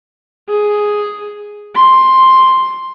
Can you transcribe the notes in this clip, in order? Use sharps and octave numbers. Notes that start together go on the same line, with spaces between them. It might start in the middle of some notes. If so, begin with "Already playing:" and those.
G#4
C6